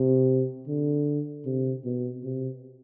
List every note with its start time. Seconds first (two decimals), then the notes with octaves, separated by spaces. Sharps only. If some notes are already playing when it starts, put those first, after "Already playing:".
Already playing: C3
0.67 D3
1.45 C3
1.85 B2
2.24 C3